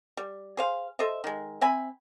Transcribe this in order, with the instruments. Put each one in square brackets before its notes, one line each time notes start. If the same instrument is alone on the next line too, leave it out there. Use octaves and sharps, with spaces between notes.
[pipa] G3
G#4 C5 F5
A4 C5 D#5 E5
D#3 G#3
C4 E5 G#5 B5